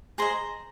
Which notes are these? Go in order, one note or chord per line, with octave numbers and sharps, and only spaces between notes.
G#4 C5 D#5 A#5 C6